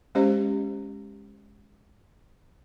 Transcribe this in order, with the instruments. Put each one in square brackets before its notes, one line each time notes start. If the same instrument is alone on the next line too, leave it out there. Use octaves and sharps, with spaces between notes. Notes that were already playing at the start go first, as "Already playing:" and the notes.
[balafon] G#3 C#4 G4 C5 D#5